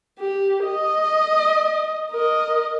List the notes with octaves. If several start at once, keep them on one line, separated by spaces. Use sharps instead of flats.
G4
D#5
A#4 D#5